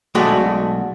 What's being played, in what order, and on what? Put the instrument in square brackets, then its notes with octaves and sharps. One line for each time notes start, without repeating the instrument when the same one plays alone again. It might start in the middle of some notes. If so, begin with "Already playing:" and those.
[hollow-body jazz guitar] B1 G#3 A3 F#4 D5